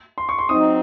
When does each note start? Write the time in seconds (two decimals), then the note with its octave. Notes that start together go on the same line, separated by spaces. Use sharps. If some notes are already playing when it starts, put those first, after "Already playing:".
0.18 C6
0.29 C#6
0.39 C6
0.49 F#3 C4 D#4 D#6